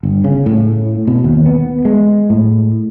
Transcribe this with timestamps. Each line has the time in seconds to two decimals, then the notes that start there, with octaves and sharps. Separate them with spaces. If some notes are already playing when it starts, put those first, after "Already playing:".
0.03 G1
0.24 C#3
0.46 A2
1.07 B2
1.24 D#2
1.46 B3
1.85 G#3
2.30 A2